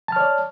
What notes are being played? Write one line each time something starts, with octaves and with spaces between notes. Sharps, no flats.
C#5 D5 A5 F6